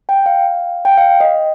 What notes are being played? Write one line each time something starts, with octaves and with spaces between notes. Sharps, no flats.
G5
F5
G5
F5
D#5